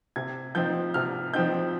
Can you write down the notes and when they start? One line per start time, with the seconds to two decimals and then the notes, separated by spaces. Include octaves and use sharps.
0.16 C3 G#6
0.55 F3 C4 D#4 G6
0.94 C3 F6
1.34 F3 C4 D#4 G6